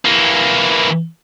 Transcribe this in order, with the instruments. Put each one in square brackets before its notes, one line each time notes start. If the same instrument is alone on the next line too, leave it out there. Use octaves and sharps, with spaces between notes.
[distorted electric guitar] E3 A#3